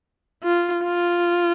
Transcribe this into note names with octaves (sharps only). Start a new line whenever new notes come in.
F4
F4